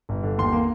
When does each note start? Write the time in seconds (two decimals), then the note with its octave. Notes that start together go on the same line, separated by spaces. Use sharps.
0.09 G1
0.23 D3
0.38 D#2 C6
0.53 A#3